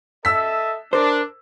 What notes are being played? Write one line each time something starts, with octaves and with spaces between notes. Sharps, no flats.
A4 D#5 E5 E6 B6
D4 A#4 C5